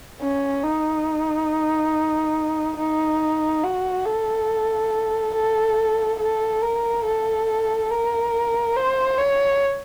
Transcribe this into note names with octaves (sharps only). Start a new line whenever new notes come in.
C#4
D#4
D#4
F#4
A4
A4
A4
A#4
A4
A#4
C5
C#5